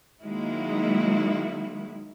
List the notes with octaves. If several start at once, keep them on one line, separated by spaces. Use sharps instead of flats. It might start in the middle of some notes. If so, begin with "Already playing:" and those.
D#3 F#3 G#3 A#3 E4